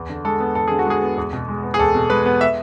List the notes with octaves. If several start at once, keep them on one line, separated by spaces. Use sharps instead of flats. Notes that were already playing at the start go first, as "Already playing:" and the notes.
Already playing: E2
D3
G#3 A4
B3
E2 A4
D3 G#4
F#4
G#3 G#4
B3
E2
B2
G#3
B3
G#4
E2 A4
B2
G#3 B4
B3
E5